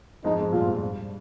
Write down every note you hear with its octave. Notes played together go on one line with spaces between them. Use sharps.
F2 G#2 D#4
F2 G#2
G2 A#2 F4
F2
G2